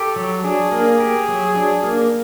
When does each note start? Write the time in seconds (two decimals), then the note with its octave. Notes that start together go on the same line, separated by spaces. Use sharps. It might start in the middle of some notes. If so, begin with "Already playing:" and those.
Already playing: G4 A4
0.16 F#3
0.44 D4 G#4
0.72 A#3
1.00 G4
1.28 F#3
1.56 D4
1.83 A#3